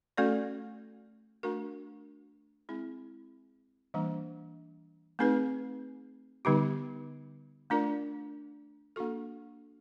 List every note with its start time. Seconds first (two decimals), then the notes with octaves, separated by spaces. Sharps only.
0.17 A3 C#4 F#4 A4 D5
1.43 A3 D4 F#4 A#4
2.69 G#3 C4 E4 G#4
3.94 E3 G3 A#3 D4
5.19 A3 C4 D#4 G#4 B4
6.45 D3 G3 B3 D#4 G4
7.70 A3 D4 F4 A#4 D5
8.96 A#3 D4 F#4 A4